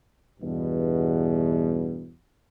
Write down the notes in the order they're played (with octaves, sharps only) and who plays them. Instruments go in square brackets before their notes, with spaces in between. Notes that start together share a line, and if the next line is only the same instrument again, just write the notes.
[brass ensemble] E2 G2 B2